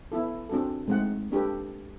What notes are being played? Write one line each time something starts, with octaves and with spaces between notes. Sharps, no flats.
B3 E4 A4
C4 D4 F#4 G#4 A4
G#3 A3 C4 D#4 F#5
A#3 D4 G4 A4 B4